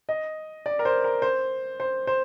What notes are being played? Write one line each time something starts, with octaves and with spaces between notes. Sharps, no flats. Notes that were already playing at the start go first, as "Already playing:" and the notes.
D#5
D5
A#4
C5
A#4
C5
C5
C5